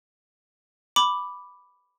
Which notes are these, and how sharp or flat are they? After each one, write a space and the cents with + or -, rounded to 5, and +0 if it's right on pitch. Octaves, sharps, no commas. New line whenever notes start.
B5 +0 D6 +0